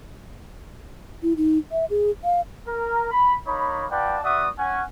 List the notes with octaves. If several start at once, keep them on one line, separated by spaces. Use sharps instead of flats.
E4
D#4
E5
G#4
F5
A#4
B5
A#3 D#4 C#5 B5
F4 B4 D5 F#5 G5 A5
B3 F#4 D5 E5 F#5 D#6
C#4 F#5 G#5